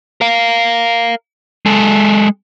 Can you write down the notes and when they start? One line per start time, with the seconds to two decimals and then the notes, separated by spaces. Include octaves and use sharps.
0.21 A#4 F5
1.66 G#3 A4